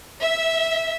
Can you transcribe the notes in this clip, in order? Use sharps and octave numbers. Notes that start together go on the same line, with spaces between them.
E5